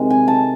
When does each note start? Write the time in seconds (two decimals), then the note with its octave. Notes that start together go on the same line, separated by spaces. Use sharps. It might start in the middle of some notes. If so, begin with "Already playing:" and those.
Already playing: C3 D#3 G#3
0.10 G#5
0.28 A5